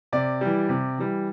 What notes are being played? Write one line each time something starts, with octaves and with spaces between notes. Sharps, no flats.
C3 D5
E3 G3
C3
E3 G3